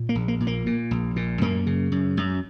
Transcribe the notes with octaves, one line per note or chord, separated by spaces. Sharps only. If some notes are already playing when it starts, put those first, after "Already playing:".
Already playing: A#2
A#3
A#1
A#3
A#2
A#3
A#2
A#1
A#2
F#2 A#3
C#3
F#2
F#2